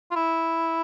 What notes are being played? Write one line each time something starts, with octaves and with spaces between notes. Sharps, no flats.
F4
E4